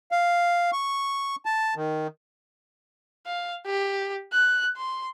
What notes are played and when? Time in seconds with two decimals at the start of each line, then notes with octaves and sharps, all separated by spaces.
0.12 F5
0.72 C#6
1.45 A5
1.76 D#3
3.26 F5
3.66 G4
4.32 F#6
4.77 C6